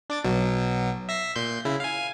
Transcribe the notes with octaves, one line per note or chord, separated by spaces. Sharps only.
D4 D6 A6
B1 B2 F#3
E5 A#6 C7
A#2 C6 G6
C#3 E4
F5 G#5